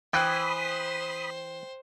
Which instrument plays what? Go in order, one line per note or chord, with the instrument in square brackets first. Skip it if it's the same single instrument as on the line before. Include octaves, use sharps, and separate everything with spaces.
[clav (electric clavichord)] E3 [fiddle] C5 [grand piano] G5 F#6 [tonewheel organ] B5 D#6